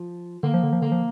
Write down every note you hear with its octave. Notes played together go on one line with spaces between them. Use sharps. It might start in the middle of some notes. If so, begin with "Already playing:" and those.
Already playing: F3
D3 A#3
F3
D3
F3
D3 A#3
F3